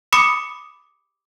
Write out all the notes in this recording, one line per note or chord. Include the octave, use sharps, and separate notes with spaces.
B5 D6 D#6 C#7